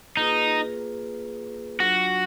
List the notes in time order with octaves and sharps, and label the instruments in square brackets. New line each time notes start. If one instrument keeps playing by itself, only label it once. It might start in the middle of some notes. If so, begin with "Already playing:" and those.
[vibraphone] A#3 F4 G#4 B4 [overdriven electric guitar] D#4
[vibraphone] F#3 D4 F4 [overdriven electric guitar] F#4